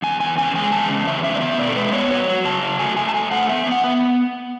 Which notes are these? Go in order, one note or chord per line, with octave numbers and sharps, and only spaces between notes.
E2 G#5
E2 G#5
C#3 G#5
G#3 G#5
E2 A5
C#3
E2 E5
C#3 E5
D5
B3 E5
B2 D5
A4
G#3 B4
B3 C#5
F#3 C#5
F#3
C#3 A5
F#3
A3 G#5
A3 G#5
A5
A3 G#5
A3 F#5
B3 E5
B3
F#5
B3